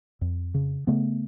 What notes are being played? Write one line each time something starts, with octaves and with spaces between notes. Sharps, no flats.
F2
C#3
C#3 A3 B3